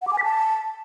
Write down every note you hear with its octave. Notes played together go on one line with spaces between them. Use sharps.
F#5
D6
G#5
B6
A5